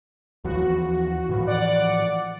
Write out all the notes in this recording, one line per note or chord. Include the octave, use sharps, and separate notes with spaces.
D#2 E3 F3 F#4
A2 E3 F3
D5 F#5